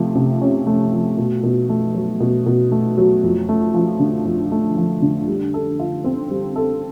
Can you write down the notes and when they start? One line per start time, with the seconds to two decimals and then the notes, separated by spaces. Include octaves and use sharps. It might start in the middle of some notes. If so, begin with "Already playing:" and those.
Already playing: C3 F3 A3
0.15 C3
0.41 C#4
0.67 A3
0.92 F3
1.17 B2
1.43 B2
1.69 A3
1.95 F#3
2.20 B2
2.46 B2
2.72 A3
2.98 F#3
3.23 F2
3.49 A3
3.74 F3
4.00 D3
4.25 F2
4.52 A3
4.77 F3
5.02 D3
5.28 G3
5.54 A4
5.79 F4
6.04 C4
6.30 G3
6.56 A4